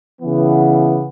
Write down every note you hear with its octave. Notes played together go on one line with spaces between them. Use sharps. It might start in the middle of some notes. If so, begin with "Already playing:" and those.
C#3 E3 B3